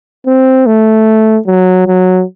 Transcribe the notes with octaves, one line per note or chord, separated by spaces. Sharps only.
C4
A3
F#3
F#3